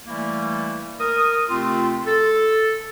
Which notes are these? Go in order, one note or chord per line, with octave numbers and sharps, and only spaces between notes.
E3 G3 A3 A#3 E4
A#4 D#6
C3 A3 C4 F4
A4